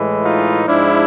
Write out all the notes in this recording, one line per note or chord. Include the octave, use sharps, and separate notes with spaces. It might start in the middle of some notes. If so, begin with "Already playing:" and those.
Already playing: A2 E3 G#3
D#4 F4
G#2 F3 G#3 D4 E4